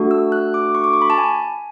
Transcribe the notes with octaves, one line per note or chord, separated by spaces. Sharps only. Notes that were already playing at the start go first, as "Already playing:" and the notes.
Already playing: A3 D4 F#4 A4
E6
F#6
D6
C#6
D6
C#6
B5
A5
G#5